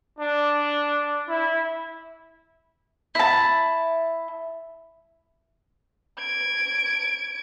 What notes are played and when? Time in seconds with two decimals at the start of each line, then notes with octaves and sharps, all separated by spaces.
0.19 D4
1.28 E4
3.15 E4 A5
6.19 G#6 D7